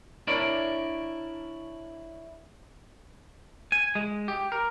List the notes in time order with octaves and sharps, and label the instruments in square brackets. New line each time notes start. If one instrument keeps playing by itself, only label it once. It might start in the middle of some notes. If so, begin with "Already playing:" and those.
[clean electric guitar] D4 E4 A#4 C#5 D5
G#5
G#3
G4
A#4